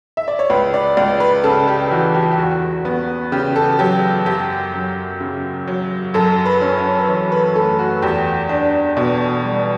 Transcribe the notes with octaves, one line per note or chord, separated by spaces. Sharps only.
E5
D5
C#5
C#2 B4
D5
C#2 D5
B4
C#3 A4
G4
E3 F#4
G4
G4
E2 F#4
B3
C#3 G4
A4
F#3 G4
F#2 G4
F#2
C#3
F#3
F#2 A4
B4
C#4
C#5
B4
E3 C#5
B4
A3 A4
F#4
E2 G4
D4
B2
G3